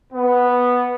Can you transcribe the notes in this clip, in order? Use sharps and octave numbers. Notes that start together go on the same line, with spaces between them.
B3